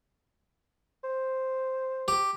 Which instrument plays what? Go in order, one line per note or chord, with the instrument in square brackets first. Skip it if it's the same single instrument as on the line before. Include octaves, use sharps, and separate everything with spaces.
[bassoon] C5
[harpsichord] G4